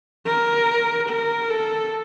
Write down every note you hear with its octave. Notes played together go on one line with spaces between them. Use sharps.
A#4
A#4
A4